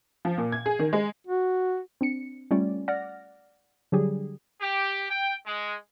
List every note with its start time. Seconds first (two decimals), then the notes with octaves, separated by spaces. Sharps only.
0.25 F3
0.37 A#2
0.52 G#6
0.66 G#4
0.79 D#3
0.93 G#3
1.27 F#4
2.01 C4 D4 C#7
2.51 G3 A3 C#4 F4 D5
2.88 D5 F#5 F6 A#6
3.92 D3 F#3 G3 G4 G#4
4.61 G4
5.10 G5
5.46 G#3